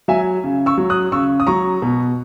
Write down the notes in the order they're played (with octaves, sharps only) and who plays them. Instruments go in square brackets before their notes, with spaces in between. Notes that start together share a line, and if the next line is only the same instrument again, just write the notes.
[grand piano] F#3 E5 G#5
C#3
C#6 E6
F#3
D#6 F#6
C#3 C#6 E6
D#6
F#3 A#5 C#6
B2